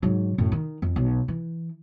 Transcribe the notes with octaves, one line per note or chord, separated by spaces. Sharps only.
G#2 F#3
F#2 A2
D#3
F2
B1
E3